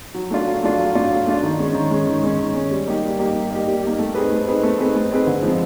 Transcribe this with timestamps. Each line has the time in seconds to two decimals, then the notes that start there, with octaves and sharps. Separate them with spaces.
0.14 F#3
0.30 A3 D4 F4
0.47 F#3
0.63 A3 D4 F4
0.79 F#3
0.95 A3 D4 F4
1.11 F#3
1.27 A3 D4 F4
1.43 D#3
1.59 G#3 C#4
1.75 D#3
1.91 G#3 C#4
2.06 D#3
2.23 G#3 C#4
2.38 D#3
2.55 G#3 C#4
2.71 G3
2.87 A#3 D#4 G4
3.03 G3
3.19 A#3 D#4 G4
3.35 G3
3.51 A#3 D#4 G4
3.67 G3
3.83 A#3 D#4 G4
3.99 A3
4.15 C4 D#4 G#4 B4
4.31 A3
4.47 C4 D#4 G#4 B4
4.63 A3
4.78 C4 D#4 G#4 B4
4.96 A3
5.12 C4 D#4 G#4 B4
5.27 D3
5.42 F3 G#3 C4